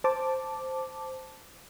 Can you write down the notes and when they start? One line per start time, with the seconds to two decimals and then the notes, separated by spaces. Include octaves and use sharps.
0.04 C5 A5 D6